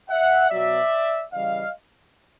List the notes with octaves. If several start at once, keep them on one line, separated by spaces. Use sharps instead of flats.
E5 F#5
B2 F#3 D5 E5
C#3 E3 G3 D#5 F5